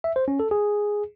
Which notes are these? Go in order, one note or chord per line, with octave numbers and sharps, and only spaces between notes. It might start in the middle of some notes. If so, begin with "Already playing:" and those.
E5
C5
C#4
A4
G#4